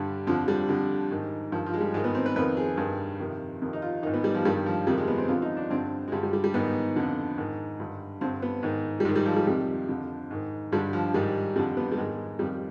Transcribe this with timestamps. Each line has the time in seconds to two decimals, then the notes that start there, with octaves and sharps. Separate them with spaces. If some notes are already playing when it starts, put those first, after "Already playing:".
Already playing: G2 D3 G3
0.27 F2 D3 F3
0.48 G3
0.68 F2 D3
1.11 G#2 D#3
1.52 G2 D#3 F3
1.66 F3
1.74 G#3
1.81 G3
1.94 G#2 G#3
1.97 D#3
2.04 B3
2.15 C4
2.26 B4
2.36 F2 D#3 B4
2.57 G#4
2.77 G2 D#3
3.20 F2 C3 D#3
3.62 F2 C3 D#3
3.73 D#4
3.82 F4
4.03 D#3 D#4
4.07 G#2
4.14 B3
4.24 G3
4.35 F3
4.45 G2 D#3 G3
4.66 F3
4.87 F2 C3 D#3 G3
4.97 G#3
5.08 B3
5.18 C4
5.28 F2 D3 F4
5.42 D#4
5.57 D4
5.70 G2 D3 C4
6.08 G#3
6.12 G2 D3 G3
6.23 G3
6.33 G3
6.44 G3
6.54 G#2 D#3 B3
6.96 F2 D3
7.38 G#2 D#3
7.80 G2 D3
8.21 G2 D3 C4
8.42 B3
8.63 G#2 D#3
9.00 G3
9.05 G#2 G#3
9.09 D#3
9.16 G3
9.26 F3
9.36 G3
9.47 F2 C3 D#3 G3
9.89 F2 D3
10.31 G#2 D#3
10.72 G2 D3 G3
10.93 F3
11.14 G#2 D#3 G3
11.56 F2 G3
11.59 D3
11.77 B3
11.92 G3
11.97 G#2 D#3 G#3
12.39 F2 D#3 G3